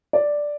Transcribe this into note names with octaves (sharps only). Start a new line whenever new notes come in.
D5